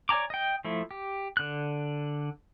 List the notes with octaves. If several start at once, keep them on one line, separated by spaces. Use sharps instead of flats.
C#5 D5 G#5 A#5 D6
D#5 G5
F3 A3 E4
G4
D3 F#6